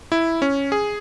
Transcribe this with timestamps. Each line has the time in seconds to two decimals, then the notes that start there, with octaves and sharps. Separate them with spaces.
0.12 E4
0.42 C#4
0.72 G#4